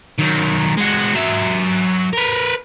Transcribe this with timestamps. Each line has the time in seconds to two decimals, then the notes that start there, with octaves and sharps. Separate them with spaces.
0.19 D#3 F#3
0.77 G#3 F#4
1.14 F#3 E5
2.13 A#4 B4